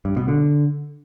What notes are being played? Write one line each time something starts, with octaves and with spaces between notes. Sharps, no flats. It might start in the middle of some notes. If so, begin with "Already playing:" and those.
G2
B2
D3